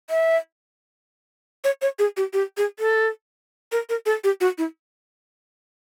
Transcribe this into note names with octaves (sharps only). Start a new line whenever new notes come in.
E5
C#5
C#5
G#4
G4
G4
G#4
A4
A#4
A#4
A4
G4
F#4
E4